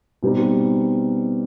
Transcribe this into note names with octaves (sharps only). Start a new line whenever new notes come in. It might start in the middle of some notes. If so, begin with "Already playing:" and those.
B2 G3 C4 D#4